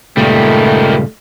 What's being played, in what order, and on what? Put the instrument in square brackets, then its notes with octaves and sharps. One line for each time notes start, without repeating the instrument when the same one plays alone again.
[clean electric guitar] C#2 G2 A#2 [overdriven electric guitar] D#3 G3 [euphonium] A3